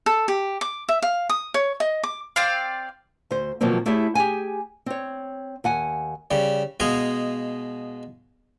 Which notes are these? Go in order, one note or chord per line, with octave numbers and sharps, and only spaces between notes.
A4
G4
D6
E5
F5
D#6
C#5
D#5
D6
C4 D5 F5
D2 C5
B2 D#3 F3 F#3 A#3 C4
A3 E4 G4 G#4 C#5 E5
G4 G#4 G5 G#5
C4 C#5
D#2 F#5 G#5
C#3 G3
B2 G#3 D#5 F5 G#5